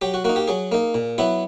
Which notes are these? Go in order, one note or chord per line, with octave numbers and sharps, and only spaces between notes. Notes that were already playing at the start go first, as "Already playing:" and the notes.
F#3 G4
F#4
A#3 D#4 F#4
G4
F#3 G#4
A#3 D#4
A#2
F#3 B3 E4